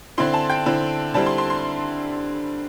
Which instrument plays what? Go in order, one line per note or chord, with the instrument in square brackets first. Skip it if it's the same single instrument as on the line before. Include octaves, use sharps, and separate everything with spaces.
[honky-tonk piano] D3 C4 E4 C6
A5
G5
D3 C4 E4
D3 G3 C4 E4 A5
C6
C6
C6